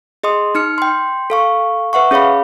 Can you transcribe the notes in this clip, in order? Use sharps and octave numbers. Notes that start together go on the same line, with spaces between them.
G#4 D#5 C6 D#6
D#4 F6 C#7
G5 C6
A4 F5 C#6
B4 E5 F#5 C#6
C#4 G#4 C#5 F5 B5